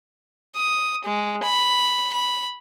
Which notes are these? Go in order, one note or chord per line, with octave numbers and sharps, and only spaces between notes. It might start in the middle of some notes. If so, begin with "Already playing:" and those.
D#6
G#3
B5
B5